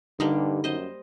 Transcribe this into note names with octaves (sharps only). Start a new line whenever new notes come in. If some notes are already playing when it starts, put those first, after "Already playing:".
G2 D3 G3 A#3 D#4
F#2 C5 D#5